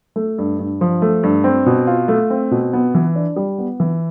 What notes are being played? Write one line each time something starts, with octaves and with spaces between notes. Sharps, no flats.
A3
G2
G2
F3
A3
G2
C4
B2
F4
A3
C4
B2
B3
E3
D4
G3
B3
E3